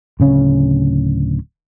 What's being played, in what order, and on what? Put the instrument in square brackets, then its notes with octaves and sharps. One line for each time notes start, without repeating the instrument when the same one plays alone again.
[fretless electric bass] D1 C#3 C#4